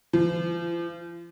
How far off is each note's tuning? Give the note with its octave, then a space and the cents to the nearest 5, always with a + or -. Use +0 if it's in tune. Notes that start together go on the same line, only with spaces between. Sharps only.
F3 -40